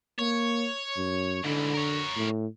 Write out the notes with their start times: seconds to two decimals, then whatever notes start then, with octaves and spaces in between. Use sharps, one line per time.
0.19 A#3 C#5
0.97 F#2
1.44 G#2 D3 E3
1.74 A#4 C#5
2.16 A2